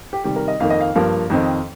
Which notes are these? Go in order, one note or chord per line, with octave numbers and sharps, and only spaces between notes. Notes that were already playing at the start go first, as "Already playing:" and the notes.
G4
C3 D#3 G3 G4
A#4
D#5
F2 D#3 A#3 F5
D#5
F5
G2 F3 A#3
F2 D#3 C4 D#4